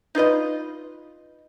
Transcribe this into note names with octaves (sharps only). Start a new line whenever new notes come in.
D#4 F4 B4 D#5